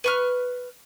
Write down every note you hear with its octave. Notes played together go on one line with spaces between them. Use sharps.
B4 C#6 F6